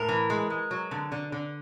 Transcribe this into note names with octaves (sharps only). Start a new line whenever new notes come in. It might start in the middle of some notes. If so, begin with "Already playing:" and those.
Already playing: A2 A#4
E3
G#3
G#3
F#3
D3
D3
D3